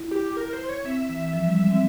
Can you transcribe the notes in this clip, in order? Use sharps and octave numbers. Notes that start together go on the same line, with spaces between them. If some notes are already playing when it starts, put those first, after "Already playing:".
Already playing: E4
G4
A#4
C5
C#5
C4 E5
E3
F3
G3
G#3
C4